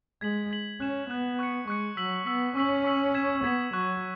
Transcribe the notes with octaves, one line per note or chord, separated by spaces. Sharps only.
G#3 G#6 B6 F#7
G#6 B6 F#7
C#4 F#6 E7
B3 F#6 E7
C#6 F#6 C#7
G#3 C#6 F#6 C#7
F#3 E6 B6 F#7
B3 E6 B6 F#7
C#4 C#6 E6 B6 F#7
C#6 E6 B6 F#7
G#6 B6 E7
B3 G#6 B6 E7
F#3 C#6 F#6 E7